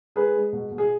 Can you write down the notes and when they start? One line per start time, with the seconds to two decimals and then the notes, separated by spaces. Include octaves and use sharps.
0.16 G#3 G#4 B4
0.35 G#3
0.53 B2
0.71 B2
0.78 G#4